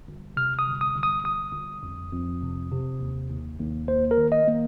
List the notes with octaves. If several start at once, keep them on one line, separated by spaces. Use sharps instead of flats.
G1
C3 F6
D#6
G1
D#6
G1
D#6
G1 D#6
G1
F2
F2
C3
C3
D#2
D#2
D#2
A#3 C5
A#4
D#3
D#5
A#3